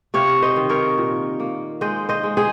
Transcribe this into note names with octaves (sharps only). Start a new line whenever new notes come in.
C3 C#5 F5
C5 D#5
D#3
A#4 C#5
A#2
A#3
G#3 C5 D#5
C5 D#5
G#3
G#4 C5